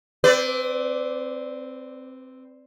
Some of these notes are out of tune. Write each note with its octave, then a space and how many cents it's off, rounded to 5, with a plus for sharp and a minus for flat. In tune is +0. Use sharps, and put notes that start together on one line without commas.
C4 +0 B4 +35 D5 -5